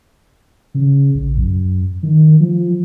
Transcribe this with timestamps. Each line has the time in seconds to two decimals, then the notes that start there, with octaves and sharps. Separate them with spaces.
0.74 C#3
1.14 A#1
1.37 F#2
2.03 D#3
2.40 F3